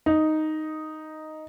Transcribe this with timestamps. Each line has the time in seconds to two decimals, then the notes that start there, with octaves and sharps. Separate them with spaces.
0.06 D#4